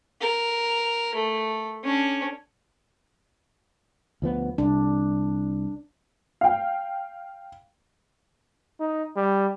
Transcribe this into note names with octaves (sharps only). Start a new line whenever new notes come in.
A#4
A3
C#4 D4
D2 F3 B3
C2 D4
F5 G5
D#4
G3